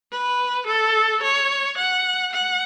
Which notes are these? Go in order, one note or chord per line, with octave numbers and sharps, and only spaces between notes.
B4
A4
C#5
F#5
F#5